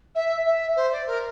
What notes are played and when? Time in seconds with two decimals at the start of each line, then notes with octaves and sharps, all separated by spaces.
0.15 E5
0.45 E5
0.76 C5
0.92 D5
1.07 A#4